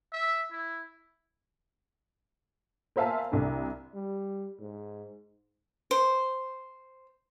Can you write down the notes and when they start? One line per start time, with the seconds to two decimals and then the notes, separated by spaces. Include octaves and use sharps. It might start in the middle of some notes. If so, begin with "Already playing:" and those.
0.13 E5
0.52 E4
2.96 A#4 C5 E5 F5 G#5 A5
3.32 C2 D4
3.94 G3
4.60 G#2
5.91 C5